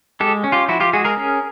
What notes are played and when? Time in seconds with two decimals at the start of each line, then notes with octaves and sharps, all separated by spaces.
0.20 G#3 G4 A4
0.44 C#4
0.52 F4 G4
0.68 F3 E4 F#4
0.80 F4 G4
0.93 G#3 F#4 G#4
1.04 G#4 A#4
1.17 C#4